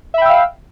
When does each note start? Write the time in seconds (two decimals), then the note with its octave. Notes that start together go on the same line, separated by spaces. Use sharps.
0.14 E5
0.18 B5
0.22 G5
0.25 E6
0.29 F5